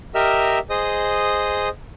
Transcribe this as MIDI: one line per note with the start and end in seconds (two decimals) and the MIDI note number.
0.15 0.59 67
0.15 0.59 70
0.15 0.59 75
0.15 0.59 76
0.15 0.59 88
0.15 0.59 89
0.70 1.69 68
0.70 1.69 72
0.70 1.69 75
0.70 1.69 87